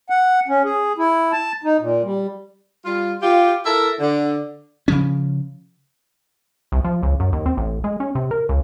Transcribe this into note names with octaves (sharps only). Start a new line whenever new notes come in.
F#5
C#4
G#4
E4
A5
D#4
A#2
G3
G3 F4
F4 G4
E4 A4 A#4 E5
D3
C#3 F3 C#4
C2
F3
C#2
F#2
D#2
C4
A1
G#3
C#4
C3
A#4
C#2